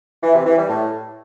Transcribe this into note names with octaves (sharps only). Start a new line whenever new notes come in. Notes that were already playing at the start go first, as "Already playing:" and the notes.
E3
C3
E3
G3
A2